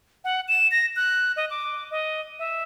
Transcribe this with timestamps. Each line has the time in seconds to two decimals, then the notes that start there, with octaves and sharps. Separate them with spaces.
0.24 F#5
0.48 E7
0.71 A#6
0.96 F#6
1.37 D#5
1.50 D6
1.91 D#5
2.39 E5